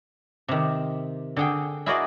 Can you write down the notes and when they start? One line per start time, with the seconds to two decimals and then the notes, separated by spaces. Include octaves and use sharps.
0.48 C3 D#3
1.36 D3 G#4 G5
1.86 E4 F#4 G#4 A#4 D5 D#5